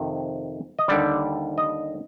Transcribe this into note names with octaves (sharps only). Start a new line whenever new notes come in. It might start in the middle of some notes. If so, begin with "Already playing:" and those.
Already playing: F2 C3 D#3
D#5
D#2 D3 G3 D5
D#5